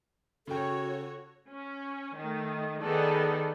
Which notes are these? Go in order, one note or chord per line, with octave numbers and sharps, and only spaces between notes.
C#3 F#4 A4 C#5 G5
C#4
D#3 A3
D#3 B3 D#4 G#4 A4 D5